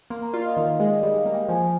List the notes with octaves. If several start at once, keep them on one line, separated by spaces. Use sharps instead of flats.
A#3 C6
A#5
F4 D5
D#5
D#3 F5
G#3 D#5
D5
G3 D#5
F5
A#3
G5
F3 G#5